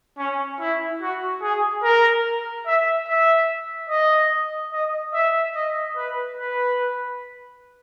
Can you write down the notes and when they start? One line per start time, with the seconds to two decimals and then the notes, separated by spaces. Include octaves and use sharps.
0.18 C#4
0.60 E4
1.01 F#4
1.42 G#4
1.83 A#4
2.66 E5
3.08 E5
3.89 D#5
4.73 D#5
5.14 E5
5.55 D#5
5.97 B4
6.37 B4